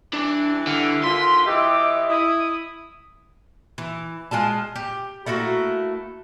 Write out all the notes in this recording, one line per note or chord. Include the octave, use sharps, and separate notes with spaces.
E3 G3 D4
D3 F6
D#2 D3 F4 C6 B6
E3 G4 D#5 E5 D6
E4 D#6
E3
G#3 F4 G#4 A5
G4
A3 A#3 E4 F#4